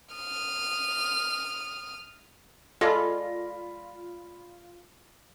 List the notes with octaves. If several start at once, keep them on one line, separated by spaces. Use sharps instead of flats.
D#6 F6
G#3 F4 A4 D5 B5 A#6